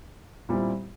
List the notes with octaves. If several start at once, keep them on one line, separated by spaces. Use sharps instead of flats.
A#2 G3 C4 E4